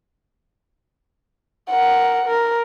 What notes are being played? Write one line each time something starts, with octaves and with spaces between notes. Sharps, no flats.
A#4 F#5
A#4